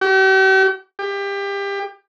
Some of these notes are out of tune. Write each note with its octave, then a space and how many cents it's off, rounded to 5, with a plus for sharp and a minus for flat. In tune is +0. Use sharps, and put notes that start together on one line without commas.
G4 -45
G4 +25